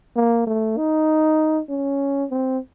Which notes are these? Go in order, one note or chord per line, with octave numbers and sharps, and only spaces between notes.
A#3
A3
D#4
C#4
C4